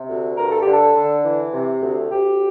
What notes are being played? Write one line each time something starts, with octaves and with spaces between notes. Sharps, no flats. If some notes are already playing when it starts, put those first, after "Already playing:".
Already playing: C3
D2
G2 A#4
A4
G4
D3
A4
D3
E3
C3
D2
D2 G4